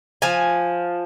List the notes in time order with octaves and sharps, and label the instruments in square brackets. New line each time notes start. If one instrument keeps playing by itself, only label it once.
[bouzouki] F3 G#5